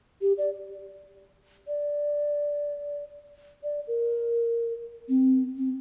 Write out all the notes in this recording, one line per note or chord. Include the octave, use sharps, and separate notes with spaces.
G4
D5
D5
D5
A#4
C4
C4